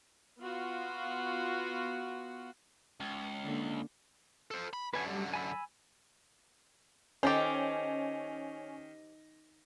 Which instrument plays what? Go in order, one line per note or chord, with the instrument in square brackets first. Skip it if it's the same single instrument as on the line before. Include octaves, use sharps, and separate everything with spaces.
[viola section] B3 F4 F#4
[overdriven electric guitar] C#2
[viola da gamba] D3 A#3
[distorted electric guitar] A4 C5
B5
[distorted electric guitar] F#2 D3 [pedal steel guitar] B4 G#5
[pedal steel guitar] G3
G#5 B5 E6
[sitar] D#3 [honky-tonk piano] C#4 [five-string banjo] G4 A4 C5